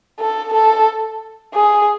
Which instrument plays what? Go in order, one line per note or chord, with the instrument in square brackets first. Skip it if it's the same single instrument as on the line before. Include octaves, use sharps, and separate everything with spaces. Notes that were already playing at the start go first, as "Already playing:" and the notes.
[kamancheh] A4
A4
G#4